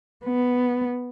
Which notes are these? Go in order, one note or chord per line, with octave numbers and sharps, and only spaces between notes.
B3